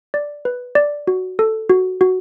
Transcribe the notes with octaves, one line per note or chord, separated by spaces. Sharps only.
D5
B4
D5
F#4
A4
F#4
F#4